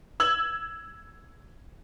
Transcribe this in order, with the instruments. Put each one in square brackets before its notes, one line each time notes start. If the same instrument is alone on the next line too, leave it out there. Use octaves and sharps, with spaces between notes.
[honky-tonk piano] E6 G#6 F#7